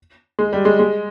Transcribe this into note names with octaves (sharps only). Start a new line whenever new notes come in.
G#3
G3
G#3
G#3